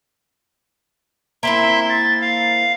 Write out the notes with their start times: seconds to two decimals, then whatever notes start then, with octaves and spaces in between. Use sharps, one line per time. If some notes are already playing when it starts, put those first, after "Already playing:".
1.43 A#3 C4 E4 E5 C6
1.89 A6
2.21 F5